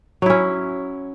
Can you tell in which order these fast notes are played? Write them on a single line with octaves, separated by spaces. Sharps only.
F#3 E4 C#4